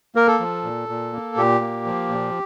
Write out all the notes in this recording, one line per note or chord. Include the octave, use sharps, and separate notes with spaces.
A#3 A#4
A4
F3
A#2
A#2
A#3
A#2 G4
A#3
F3
A#2